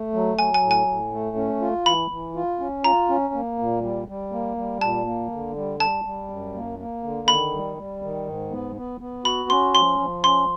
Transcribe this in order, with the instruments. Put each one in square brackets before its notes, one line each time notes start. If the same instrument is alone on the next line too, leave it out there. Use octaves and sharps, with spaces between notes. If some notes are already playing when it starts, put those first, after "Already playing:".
Already playing: [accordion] A3
F#3
[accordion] F#3 [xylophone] G#5
[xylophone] G#5
[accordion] A2
[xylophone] G#5
[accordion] A2
A3
C#4
F4
[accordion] E3 [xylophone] B5
[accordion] E3
F4
C#4
[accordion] F4 [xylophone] A#5
[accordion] C#4
A#3
A#2
G3
G3
A#3
G3
[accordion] A#2 [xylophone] A5
[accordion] A#3
D3
G3
[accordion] G3 [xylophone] A5
[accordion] G3
F#2
A#3
A#3
D3
[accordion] D#3 [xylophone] B5
[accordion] G3
G3
D#3
G#2
B3
B3
B3
[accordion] F#4 [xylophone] B5
[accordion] C#4 [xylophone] C6
[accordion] F3 [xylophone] C6
[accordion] F3
[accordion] C#4 [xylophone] C6